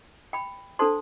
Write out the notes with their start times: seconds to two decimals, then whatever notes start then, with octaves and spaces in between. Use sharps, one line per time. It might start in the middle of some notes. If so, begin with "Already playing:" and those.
0.33 G5 B5
0.79 D4 A4 C5 A5 C6